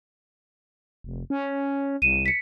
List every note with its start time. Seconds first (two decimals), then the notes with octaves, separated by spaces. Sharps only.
1.04 F1
1.30 C#4
2.02 C2 D#7 E7
2.26 B6 C#7